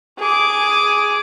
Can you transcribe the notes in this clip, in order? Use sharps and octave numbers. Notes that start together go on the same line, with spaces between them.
G#4 D6